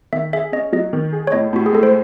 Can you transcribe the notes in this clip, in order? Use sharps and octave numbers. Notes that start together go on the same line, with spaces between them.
D#3 E5
G#4 E5
C#4 D#5
F#3 D#5
D#3
G#4
C#5
A2 D#5
A2 F#4
G#4
G#3 A4
C5